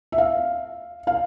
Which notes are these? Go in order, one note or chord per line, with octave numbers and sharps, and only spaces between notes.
E5
F5
F5